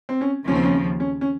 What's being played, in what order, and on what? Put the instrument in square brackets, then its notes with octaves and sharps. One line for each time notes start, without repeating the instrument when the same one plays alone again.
[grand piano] C4
C#4
[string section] D#2 C#3 F3 [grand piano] C#4
[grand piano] C4
C#4
C#4
C#4